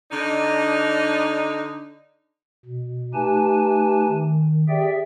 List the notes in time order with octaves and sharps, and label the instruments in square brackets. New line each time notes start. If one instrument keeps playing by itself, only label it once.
[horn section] D3 D4 D#4
[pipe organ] B2
A3 D#4 G4 B4 G#5 A5
D#3
G4 G#4 D5 E5 G5